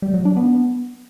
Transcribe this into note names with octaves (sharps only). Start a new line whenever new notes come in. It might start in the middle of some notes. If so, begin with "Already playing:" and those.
G3
F#3
D4
B3